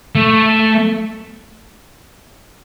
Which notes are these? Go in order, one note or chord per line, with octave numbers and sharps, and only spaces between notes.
A3